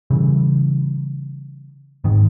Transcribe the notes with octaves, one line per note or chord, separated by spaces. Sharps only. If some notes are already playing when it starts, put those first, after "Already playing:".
C#3 E3 G3
G#2 D#3